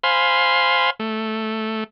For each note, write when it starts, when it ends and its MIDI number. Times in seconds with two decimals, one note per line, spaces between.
0.04 0.90 72
0.04 0.90 77
0.04 0.90 80
0.04 0.90 83
0.04 0.90 84
1.00 1.84 57